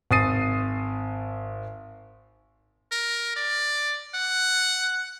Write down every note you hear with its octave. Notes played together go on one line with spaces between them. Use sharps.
G#1 D#6 A6 C7 D#7
A#4
D5
F#5